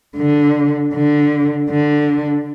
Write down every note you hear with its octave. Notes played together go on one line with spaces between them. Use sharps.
D3
D3
D3